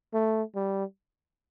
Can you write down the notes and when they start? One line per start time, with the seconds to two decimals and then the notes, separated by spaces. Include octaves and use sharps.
0.14 A3
0.55 G3